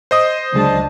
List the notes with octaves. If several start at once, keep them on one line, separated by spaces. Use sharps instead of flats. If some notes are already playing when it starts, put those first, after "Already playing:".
C5 D#5 D#6
C#2 D3 F#3 G#3 D4 A5